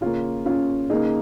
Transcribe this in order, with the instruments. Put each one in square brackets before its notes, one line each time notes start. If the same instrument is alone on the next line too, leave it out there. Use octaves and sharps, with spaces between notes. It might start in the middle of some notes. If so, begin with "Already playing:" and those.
[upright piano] C#3 A#3 C#4 F4
C#4 F4
C#3 A#3 D#4 G#4